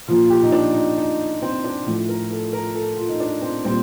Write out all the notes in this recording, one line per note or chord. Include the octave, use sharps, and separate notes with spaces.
A#2 F3 F4
F4
G4
D#4
D4
D#4
D#4
C4
D4
A2 F3
A#4
A4
A#4
A4
F4
D#4
D4
C4
A#2 G3 C4